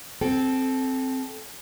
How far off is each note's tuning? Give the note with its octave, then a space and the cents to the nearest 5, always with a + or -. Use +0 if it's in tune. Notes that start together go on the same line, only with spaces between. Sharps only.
C4 +0 A4 -20 G5 +0